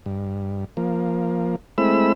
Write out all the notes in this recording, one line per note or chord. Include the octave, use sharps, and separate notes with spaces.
G2
F3 A#3
G#3 A3 C4 E4 B5 E6